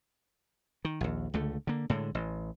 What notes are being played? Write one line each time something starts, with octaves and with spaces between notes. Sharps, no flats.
D#3
A#1 D#2
C#2 D3 A3
D3 A#3
A2 D3 G#3
A1